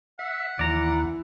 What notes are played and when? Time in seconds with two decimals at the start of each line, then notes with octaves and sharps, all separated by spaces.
0.19 E5 F#5
0.59 D#2 E3 D5 A#5